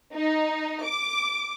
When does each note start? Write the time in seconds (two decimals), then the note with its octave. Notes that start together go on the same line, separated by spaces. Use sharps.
0.15 D#4
0.85 D6